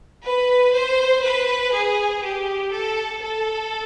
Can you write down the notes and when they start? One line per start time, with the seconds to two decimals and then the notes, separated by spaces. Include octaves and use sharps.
0.24 B4
0.73 C5
1.23 B4
1.72 G#4
2.22 G4
2.71 A4
3.21 A4